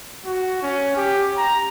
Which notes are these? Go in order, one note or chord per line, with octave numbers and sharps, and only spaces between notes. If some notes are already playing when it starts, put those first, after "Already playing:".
F#4
C#4
G4
A#5